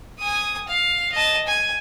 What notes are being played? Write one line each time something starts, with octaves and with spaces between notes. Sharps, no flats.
G#5 D#6
F5
D#5 A5
G#5